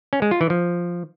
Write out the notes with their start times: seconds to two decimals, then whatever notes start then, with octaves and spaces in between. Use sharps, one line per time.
0.13 C#4
0.22 G#3
0.31 F4
0.41 E3
0.50 F3